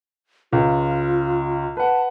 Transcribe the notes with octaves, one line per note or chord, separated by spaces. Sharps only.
C#2 F4
B4 F#5 A5